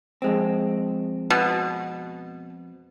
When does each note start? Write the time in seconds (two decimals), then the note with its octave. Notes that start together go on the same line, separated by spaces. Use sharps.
0.22 F2 G#3 C4
1.30 B2